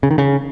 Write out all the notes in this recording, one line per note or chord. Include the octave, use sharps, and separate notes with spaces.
C#3
D#3
C#3